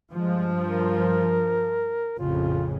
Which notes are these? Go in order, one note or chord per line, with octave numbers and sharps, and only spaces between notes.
G2 F3 G#3
A#4
A1 F2 C#3 F4